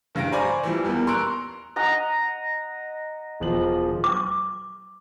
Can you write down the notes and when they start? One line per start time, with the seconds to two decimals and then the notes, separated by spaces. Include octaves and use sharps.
0.15 F#1 G2 F5 A#6 D7
0.32 C5 D5 G#5 A#5 B5 C#6
0.63 E3 F3 G3
0.85 E2 G3 A#3 B3
1.07 A#5 C6 C#6 E6 F#6 D7
1.76 D#5 F#5 A#5
3.40 E1 F3 F#7
4.04 D6